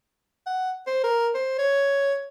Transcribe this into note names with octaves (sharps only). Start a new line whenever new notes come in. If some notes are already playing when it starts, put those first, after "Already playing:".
F#5
C5
A#4
C5
C#5